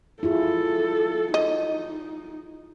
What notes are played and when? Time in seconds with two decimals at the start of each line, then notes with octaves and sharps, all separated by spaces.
0.23 E4 F4 G#4 A4
1.34 D#4 D#5